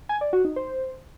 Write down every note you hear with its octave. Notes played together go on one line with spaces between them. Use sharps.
G#5
D5
F#4
D#4
C5